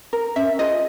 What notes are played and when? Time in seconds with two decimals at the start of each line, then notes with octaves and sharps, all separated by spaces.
0.13 A#4
0.36 C#4 E5
0.59 F4 G#4 D#5